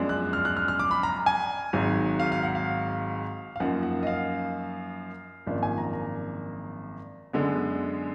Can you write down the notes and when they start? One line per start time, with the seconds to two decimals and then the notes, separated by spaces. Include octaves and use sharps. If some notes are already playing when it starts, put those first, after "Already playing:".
Already playing: F#2 F3 G#3 B3 D4
0.09 F#6
0.33 F6
0.45 F#6
0.57 F6
0.68 F6
0.79 D6
0.91 B5
1.03 A#5
1.26 G#5
1.73 G#1 G#2 F#3
2.20 F5
2.32 F5
2.43 F#5
2.55 F5
3.56 F5
3.60 F#2 F3 A#3 D#4 F#5
3.83 F#5
4.03 D#5
4.07 F5
5.47 G#1 F#2 F3 A#3 D4
5.63 G#5
5.78 A#5
5.93 A#5
7.33 F#2 D3 G#3 B3